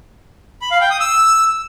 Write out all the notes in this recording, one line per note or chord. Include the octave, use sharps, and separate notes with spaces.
B5
F5
G5
D#6
E6